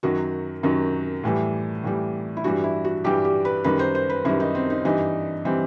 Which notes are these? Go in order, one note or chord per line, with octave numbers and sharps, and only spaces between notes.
F#2 D#3 F#3 F#4
F#2 D#3 F#3
A2 E3 G3
A2 E3 G3
E4
G2 E3 G3 F#4
E4
F#4
G2 E3 G3 G4
G4
B4
F#2 D#3 G3 B4
C5
C5
B4
F#2 D#3 G3 E4
D#4
C4
D#4
G2 E3 G3 D#4
E3 G3 C4